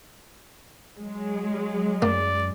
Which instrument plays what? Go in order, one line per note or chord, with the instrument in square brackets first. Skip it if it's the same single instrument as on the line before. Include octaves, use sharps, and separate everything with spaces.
[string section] F#3 G#3
[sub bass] F#2 [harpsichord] A#3 [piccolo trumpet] D5